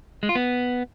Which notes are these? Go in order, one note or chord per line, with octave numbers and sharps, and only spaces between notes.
G#3
F4
B3